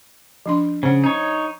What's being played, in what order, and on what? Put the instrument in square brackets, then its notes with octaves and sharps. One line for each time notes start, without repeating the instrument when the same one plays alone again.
[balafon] F3 D4 C6
[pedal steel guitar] C#3 [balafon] C5 F#5
[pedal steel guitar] D#4 C#5